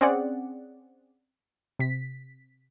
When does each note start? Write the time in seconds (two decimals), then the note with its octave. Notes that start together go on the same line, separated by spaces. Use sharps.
0.01 C4 C#4 G#4 D5 F#5
1.79 C3 B6